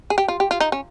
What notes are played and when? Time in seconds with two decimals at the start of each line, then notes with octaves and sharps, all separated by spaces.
0.10 G#4
0.18 G4
0.28 F4
0.40 G4
0.51 F4
0.60 D#4
0.72 C#4